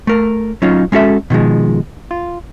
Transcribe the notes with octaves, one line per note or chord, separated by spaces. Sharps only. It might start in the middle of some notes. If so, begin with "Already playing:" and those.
A3 A#4
F#3 C#4 D#4 F4
G#3 C#4 F#4 A4 E5
B2 D#3 F3 G#3
F4